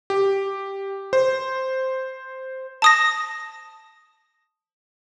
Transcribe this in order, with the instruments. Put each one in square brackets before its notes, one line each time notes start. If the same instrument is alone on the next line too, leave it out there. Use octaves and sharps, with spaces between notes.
[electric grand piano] G4
C5
[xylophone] A5 D#6 A#6